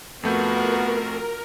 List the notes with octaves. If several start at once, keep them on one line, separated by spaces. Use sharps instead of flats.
F2 A3 B3 F4 F#4 A#4 G6